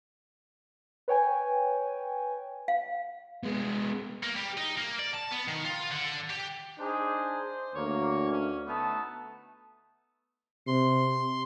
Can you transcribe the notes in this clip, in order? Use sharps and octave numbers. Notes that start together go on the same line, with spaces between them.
B4 C#5 G5 G#5
F5
G#3 B3
A#3
G3
D#4
A#3
D5
A5
B3
D#3
F4
D3
G4
D4 D#4 G#4 C5
D2 A#3 C#5
C#4
A3 B3 D#4 A5
C3 C6